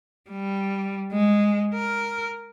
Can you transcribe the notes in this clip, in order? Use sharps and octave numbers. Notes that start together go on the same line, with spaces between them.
G3
G#3
A#4